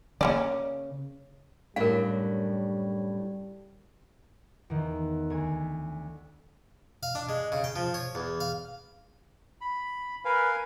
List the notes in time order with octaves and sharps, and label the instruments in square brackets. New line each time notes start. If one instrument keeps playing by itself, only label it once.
[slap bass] C#3 [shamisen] A#3 C#4 D5
[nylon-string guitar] F#2 A2 D4 [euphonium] G3 [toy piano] A#4 F5
[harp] E2 D#3
D2 G#5
[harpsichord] F5
D4
G#3
C#3
G5
F3
C#5
E2
F5
[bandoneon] B5
[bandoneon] A#4 F5 G#5 [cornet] B4